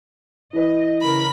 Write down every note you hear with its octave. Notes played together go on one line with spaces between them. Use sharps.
E3 B4 D#5
C#3 A#4 B5